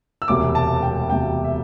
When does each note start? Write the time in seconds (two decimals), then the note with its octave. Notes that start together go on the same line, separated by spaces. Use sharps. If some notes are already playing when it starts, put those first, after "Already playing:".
0.22 E6
0.28 E1 D2 C3 D6
0.55 A5
0.82 G5
1.10 E1 D2 C3 G5
1.44 E5